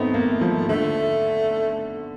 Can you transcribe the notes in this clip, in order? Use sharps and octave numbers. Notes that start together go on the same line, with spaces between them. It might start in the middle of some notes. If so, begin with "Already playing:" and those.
Already playing: A3 B3 C4 D#4
A#3
F3
D3 A3